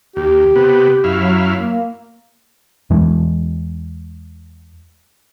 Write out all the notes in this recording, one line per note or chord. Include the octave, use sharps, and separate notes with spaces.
D#2 G4
C3 B3
F#2 E4 F5
F#3
A#3
E2 E3 G#3 D4